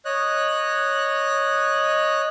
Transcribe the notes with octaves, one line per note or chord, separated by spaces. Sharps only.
C#5 D#5 F#6